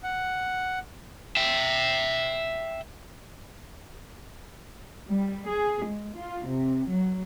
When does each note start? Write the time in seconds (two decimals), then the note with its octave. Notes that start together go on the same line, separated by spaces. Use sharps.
0.03 F#5
1.36 E5 G5
5.09 G3
5.48 G#4
5.85 G#3
6.16 F4
6.48 C3
6.89 F#3